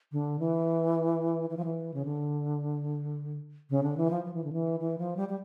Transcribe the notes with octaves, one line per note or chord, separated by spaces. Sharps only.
D3
E3
E3
F3
E3
C#3
D3
C#3
D3
E3
F3
F3
E3
D3
E3
E3
F3
G3
G3